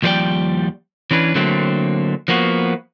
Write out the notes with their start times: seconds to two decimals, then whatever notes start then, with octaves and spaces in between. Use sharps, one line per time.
0.02 D#2 F3 G3 G#4 D5 G5
1.11 E3 C#4 D4 B4
1.35 D3 F#3 A3 A#3 C4
2.28 F3 A#3 B3 F#4